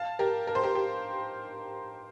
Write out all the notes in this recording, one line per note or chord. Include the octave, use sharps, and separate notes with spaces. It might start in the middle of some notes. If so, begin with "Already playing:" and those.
Already playing: F5 A5
G4 A#4
A#4
C5
G4 A#4
G4